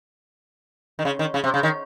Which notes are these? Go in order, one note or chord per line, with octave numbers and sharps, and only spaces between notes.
D#3
C#3
D#3
C#3
C3
C#3
D#3